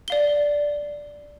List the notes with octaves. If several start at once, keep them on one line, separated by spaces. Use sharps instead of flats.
D5 F5 G7